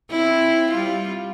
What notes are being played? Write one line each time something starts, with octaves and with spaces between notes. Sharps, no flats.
C4 E4
G3 F4